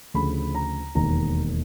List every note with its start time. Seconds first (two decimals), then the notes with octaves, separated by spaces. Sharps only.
0.14 D2 C#3 F3 B5
0.55 A#5
0.95 E1 D#2 D#3 A#5